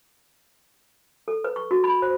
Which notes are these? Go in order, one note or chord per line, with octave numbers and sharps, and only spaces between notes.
A4
B4
C#6
F#4
B5
C5